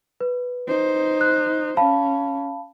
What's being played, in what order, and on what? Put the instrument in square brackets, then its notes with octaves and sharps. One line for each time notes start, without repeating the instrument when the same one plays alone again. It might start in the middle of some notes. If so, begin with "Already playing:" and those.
[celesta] B4
[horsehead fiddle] D#4 C5
[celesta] F#6
[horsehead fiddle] C#4 [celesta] F5 A5 B5